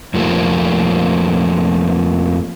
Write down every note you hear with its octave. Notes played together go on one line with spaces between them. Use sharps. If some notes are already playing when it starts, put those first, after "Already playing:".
F2 F3 A3 A#3